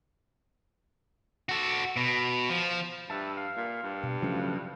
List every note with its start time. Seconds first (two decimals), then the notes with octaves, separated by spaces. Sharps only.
1.49 F#4 A4
1.96 B2
2.50 F3
3.10 G2 E5 A5
3.37 F5
3.57 A#2
3.83 G2
4.03 B2
4.22 C#3 F3 F#3 A3 C#4 F4